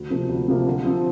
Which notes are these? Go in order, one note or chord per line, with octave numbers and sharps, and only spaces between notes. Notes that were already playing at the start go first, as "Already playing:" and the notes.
Already playing: D2
C3 F3 A#3
D2
C3 F3 A#3
D3
F3 C4